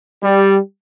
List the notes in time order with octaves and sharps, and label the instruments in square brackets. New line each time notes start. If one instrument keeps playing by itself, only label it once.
[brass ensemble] G3 G4